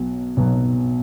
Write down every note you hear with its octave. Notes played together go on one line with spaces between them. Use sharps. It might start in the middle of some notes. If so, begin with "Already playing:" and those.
Already playing: B1 B2 F#3
B1 B2 F#3